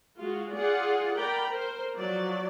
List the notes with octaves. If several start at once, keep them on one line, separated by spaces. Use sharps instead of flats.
G#3 F4 F#4
F4 G#4 D5 F#5
A#4 D5 G5 A#5 B5
A#4 C5
F3 F#3 D5